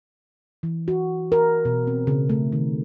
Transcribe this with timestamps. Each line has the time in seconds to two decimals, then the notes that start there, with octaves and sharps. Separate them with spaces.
0.63 E3
0.88 F#4
1.32 A#4
1.65 B2
1.87 C4
2.07 C#3
2.29 A3
2.52 D#3